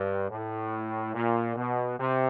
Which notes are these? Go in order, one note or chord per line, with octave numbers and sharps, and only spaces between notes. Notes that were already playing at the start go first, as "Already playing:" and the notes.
Already playing: G2
A2
A#2
B2
C3